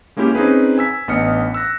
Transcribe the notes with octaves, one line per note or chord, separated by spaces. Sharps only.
G#3 A#3 C#4 E4 G4
C4 C#4 D#4 G#4 B4
G#5 E6 B6
A1 B3 D4 D#5 F6 C#7
E6 F#6 A#6